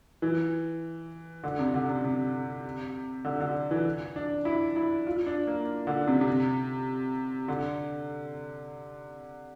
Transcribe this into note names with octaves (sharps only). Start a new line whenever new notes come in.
E3
D3
C3
D3
C3
C3
D3
D3
E3
D4
E4
E4
F4
D4
A#3
D3
C3
C3
D3